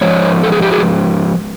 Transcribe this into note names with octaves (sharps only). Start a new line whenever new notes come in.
G#2 F3 C#5
A4
G#4
G4
F#4 G#4